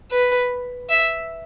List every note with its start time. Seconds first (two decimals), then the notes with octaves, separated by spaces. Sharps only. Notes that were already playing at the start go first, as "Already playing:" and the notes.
0.11 B4
0.89 E5